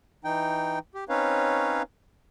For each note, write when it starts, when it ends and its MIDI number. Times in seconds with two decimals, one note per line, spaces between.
0.24 0.79 52
0.24 0.79 63
0.24 0.79 79
0.95 1.04 67
1.09 1.82 60
1.09 1.82 61
1.09 1.82 63
1.09 1.82 71
1.09 1.82 73
1.09 1.82 77